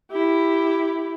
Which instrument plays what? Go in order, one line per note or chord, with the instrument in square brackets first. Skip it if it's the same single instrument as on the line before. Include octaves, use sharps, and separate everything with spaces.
[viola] E4 G4